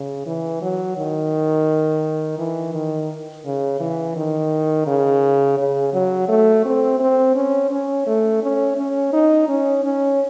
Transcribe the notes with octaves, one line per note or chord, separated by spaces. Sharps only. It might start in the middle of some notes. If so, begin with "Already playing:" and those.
Already playing: C#3
E3
F#3
D#3
E3
D#3
C#3
E3
D#3
C#3
C#3
F#3
A3
C4
C4
C#4
C#4
A3
C#4
C#4
D#4
C#4
C#4